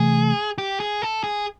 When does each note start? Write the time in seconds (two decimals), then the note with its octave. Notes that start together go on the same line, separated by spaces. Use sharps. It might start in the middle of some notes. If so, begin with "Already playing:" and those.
Already playing: C3 E3 A3 G#4
0.58 G4
0.80 G#4
1.02 A4
1.24 G#4